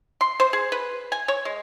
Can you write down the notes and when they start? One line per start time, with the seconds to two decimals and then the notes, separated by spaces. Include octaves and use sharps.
0.21 C6
0.40 C5
0.53 G#4
0.72 B4
1.12 G#5
1.28 C#5
1.45 G#3